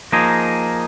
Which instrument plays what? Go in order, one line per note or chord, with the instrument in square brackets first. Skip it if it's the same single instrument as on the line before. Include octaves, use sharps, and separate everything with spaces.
[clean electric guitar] F3 A#3 D#4 G#4